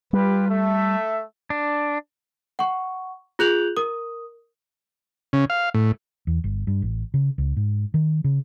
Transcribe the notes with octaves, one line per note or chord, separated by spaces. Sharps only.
G3 F4 G4 B4
A3 E5
D4
F#5 C#6
F4 G#4 F#6 G6 F7 F#7
A#4 D#6
C#3
F5
A2
E2
G1
G2
A1
C#3
C#2
G#2
D#3
C#3